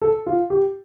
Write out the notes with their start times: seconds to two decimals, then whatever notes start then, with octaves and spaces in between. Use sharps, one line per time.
0.02 A4
0.26 F4
0.50 G4